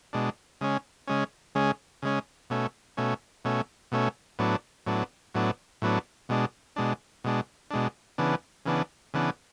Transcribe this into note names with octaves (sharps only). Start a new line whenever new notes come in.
B2 G#3 D4
C#3 G#3 C#4
C#3 G#3 C#4
C#3 G#3 C#4
C#3 G#3 C#4
B2 A3 C#4
B2 A3 C#4
B2 A3 C#4
B2 A3 C#4
A2 F#3 B3 D4
A2 F#3 B3 D4
A2 F#3 B3 D4
A2 F#3 B3 D4
B2 G#3 D4
B2 G#3 D4
B2 G#3 D4
B2 G#3 D4
C#3 E3 B3 D4
C#3 E3 B3 D4
C#3 E3 B3 D4